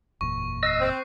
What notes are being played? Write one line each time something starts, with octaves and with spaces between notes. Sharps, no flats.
F#1 E2 A#2 C#6
D#5 E6 F#6 C7
C4